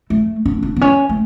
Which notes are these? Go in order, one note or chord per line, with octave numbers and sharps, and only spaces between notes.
A3
D4
D4
B3
C#4
A3